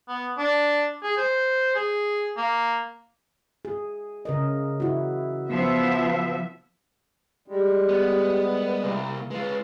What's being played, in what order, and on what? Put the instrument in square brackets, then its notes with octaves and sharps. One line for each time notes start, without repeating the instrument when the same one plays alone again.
[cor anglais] B3
D4
G#4
C5
G#4
A#3
[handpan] G#4
C#3 A#4 D#5
E4 F#4
[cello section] F3 B3 E5
[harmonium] G3 G#3 [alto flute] G4
[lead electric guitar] B3
[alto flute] A#4
[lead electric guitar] C2 [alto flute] A#3
[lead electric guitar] G#3 F4 [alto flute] B4